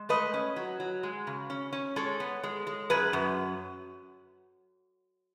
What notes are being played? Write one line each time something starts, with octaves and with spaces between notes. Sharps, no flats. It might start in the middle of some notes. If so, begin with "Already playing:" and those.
Already playing: G#3
A3 B4 D#5
C#4
F#3
F#3
G#3
C#3
C#4
C#4
G#3 A4 C#5
B3
G#3
G#3
F#2 G#4 B4
F#2